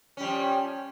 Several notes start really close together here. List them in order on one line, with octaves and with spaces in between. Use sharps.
C#4 G3 F3